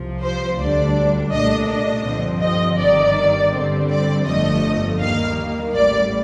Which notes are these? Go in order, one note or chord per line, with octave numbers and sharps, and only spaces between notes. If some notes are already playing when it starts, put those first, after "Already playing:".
Already playing: C2 C3 F3
C5
D2 D3 G3 D4 D5
C2 A#2 A3 D4 D#5
D#5
G2 D3 F3 C4
D#5
G1 G2 D#3 D5
G2 D3 G3 C4
D5
G1 F2 D3 F3 A3 D#5
D#2 D#3 G3 A#3 F5
A1 A2 G3 D5